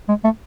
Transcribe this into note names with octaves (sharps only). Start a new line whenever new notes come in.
G#3
A3